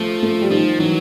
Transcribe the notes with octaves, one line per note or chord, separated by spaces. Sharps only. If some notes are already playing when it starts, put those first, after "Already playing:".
Already playing: F3 A3
A3
G3
D#3 F3
E3 F#3